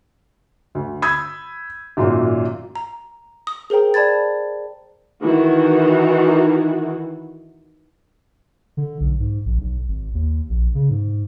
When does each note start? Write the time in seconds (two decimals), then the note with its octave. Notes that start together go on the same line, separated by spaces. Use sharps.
0.75 D2
1.02 B5 D#6 E6 G6 G#6
1.97 G#1 F#2 A#2 F#3 F4
2.76 A#5
3.47 D#6
3.70 G#4 A#4 C5 G5 A#5
3.94 D5 A5 B5 G#6 A6
5.23 D#3 E3 F#4
8.77 D3
9.00 B1
9.20 G#2
9.45 A#1
9.59 B1
9.88 G#1
10.14 D#2
10.49 A#1
10.75 C#3
10.90 G#2